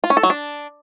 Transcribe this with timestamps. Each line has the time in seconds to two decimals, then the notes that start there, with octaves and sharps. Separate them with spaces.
0.04 F4
0.10 C#4
0.17 A4
0.23 F#3
0.30 D4